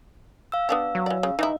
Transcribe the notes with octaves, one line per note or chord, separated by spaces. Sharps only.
F5 E6
B3 D4 G4
F#3
E3 D5
C#3
E3 G#3 D#4 E4